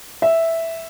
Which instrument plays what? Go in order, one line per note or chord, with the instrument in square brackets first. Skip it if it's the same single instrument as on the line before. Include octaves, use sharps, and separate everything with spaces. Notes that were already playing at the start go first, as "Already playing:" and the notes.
[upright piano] E5